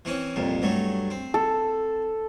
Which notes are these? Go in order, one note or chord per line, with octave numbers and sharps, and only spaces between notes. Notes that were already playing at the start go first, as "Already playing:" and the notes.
E3 C4 C#4
C2 F2 A#2
G2 F#3 A3
C4
A4